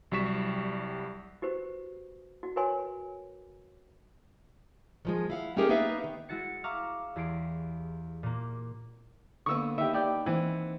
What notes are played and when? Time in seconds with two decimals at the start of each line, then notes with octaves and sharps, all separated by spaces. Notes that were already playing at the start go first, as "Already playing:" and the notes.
0.12 C2 F#3 G3 C#6 B6 E7
1.42 F#4 G4 B4 C5
2.43 F#4
2.56 F#4 A#4 B4 C#5 G#5 C6
5.05 D#3 F3 G#3
5.30 E4 F5 F#5
5.57 A3 C#4 D#4 G4 G#4 A#4
5.69 A#3 B3 D#4 B4 E5 F5
6.04 D#3
6.29 G#3 E4 F#4 A6 C#7
6.64 E5 F5 A#5 C#6 D6 E6
7.16 E2 G4 G#4 C6 C7 D7
8.23 A#2 A#3
9.46 D3 A#3 B3 C#6 E6
9.78 D#3 G4 E5
9.93 G4 D5 G5
10.26 E3 C4 F#5